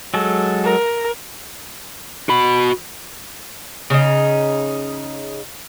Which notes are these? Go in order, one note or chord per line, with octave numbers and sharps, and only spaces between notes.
F#3 G#3 A4
A#4
F#4 B5
C#3 D#4